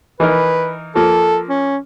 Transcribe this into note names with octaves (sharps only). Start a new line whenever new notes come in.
E3 D#4 A#4 B4
F3 A#3 A4
C#4